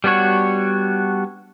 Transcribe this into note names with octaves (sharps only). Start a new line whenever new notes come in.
G3 B3 D4 F#4 C#5